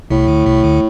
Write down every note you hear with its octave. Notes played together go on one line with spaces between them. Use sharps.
C2 A2 C3
D2 D3
C2 C3
D2 D3